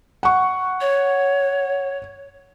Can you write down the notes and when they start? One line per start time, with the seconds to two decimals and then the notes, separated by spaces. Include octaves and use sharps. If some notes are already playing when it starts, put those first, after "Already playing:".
0.23 F#5 C#6
0.81 C#5